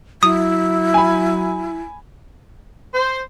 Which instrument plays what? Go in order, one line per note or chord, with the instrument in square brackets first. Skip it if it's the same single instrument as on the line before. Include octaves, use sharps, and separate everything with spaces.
[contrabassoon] F#3 [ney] E4 [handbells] D#6
[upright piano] G#5 B5
[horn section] C5